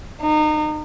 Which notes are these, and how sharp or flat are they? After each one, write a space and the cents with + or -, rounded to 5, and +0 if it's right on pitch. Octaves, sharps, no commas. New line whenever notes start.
D#4 -30